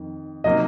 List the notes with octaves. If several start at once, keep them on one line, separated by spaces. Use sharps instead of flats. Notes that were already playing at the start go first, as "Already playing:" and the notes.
Already playing: F2 D#3
C3 F#3 A#3 D#4 D#5